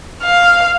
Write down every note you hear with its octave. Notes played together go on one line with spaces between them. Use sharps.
F5